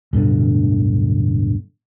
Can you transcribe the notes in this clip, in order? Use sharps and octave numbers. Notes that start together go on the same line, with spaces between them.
D1 G2 B2 D3